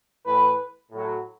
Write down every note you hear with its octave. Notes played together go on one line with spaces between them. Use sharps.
A2 E3 B4
A2 F#3